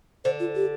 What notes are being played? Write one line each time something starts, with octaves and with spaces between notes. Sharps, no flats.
D3 C5
F4
G4